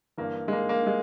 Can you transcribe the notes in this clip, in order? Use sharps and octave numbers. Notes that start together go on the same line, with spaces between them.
G2 E3 A#3
G#3
A#3
A#3
G#3